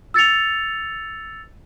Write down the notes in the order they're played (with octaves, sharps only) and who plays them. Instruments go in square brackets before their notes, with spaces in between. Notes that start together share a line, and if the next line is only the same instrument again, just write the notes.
[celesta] E6 A6 C#7 F7